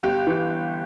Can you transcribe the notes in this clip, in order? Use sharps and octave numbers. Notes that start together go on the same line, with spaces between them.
G1 G4
E3